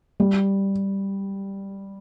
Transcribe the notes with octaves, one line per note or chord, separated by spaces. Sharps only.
G3